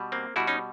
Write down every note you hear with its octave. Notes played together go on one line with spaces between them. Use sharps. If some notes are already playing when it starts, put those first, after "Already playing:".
Already playing: B2 G3
A#3 C4
B2 G3 E4 F#4
C#4 D#4